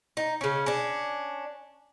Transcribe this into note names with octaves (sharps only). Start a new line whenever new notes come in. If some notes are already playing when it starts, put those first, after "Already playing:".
D#4
C#3 C#4
C#4 D4